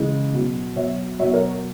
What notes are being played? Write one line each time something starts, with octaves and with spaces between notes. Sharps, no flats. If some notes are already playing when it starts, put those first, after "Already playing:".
Already playing: C#3 E3 G#3
B2 F#3
B2 F#3 C#5 E5
B2 F#3 C#5 E5
A#4 C#5